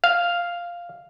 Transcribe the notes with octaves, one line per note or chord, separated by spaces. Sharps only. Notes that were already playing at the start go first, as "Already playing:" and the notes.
F5